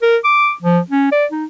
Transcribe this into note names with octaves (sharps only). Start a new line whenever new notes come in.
A#4
D6
F3
C#4
D5
D#4